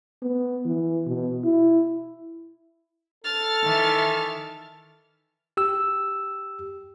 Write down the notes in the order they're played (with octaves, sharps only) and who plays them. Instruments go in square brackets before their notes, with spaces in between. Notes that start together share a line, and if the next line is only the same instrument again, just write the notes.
[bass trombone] B3
E3
B2
E4
[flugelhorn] A4 [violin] F6 A6
[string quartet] D#3 E3 E5
[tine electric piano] G4 E6